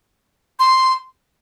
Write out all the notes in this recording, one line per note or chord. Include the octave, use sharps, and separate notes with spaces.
C6